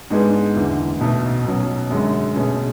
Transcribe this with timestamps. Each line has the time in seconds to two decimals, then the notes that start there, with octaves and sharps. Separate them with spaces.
0.10 G#2 G#3 B3 D4 G#4
0.55 F#1 E2 D3
1.01 B1 B2 A3
1.45 B2 F#3 C#4
1.91 F#2 D3 G#3
2.35 B2 A3 C#4 G#4